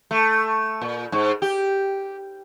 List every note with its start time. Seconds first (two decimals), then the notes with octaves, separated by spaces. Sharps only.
0.11 A3
0.81 A#2
1.12 G#2
1.42 G4